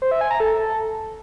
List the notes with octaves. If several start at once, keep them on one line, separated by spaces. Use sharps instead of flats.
C5
E5
G#5
A#5
A4